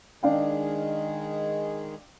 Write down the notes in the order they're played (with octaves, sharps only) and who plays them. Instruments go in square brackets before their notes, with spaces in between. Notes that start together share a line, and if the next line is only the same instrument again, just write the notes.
[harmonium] D#3 G#3 G#4 [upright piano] D4 F5 G5